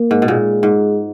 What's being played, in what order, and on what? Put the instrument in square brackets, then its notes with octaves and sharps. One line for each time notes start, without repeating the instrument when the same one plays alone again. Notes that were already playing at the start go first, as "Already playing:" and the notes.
Already playing: [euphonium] A#3
[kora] G#2
B2
[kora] A#2 [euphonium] G#3
[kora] G#2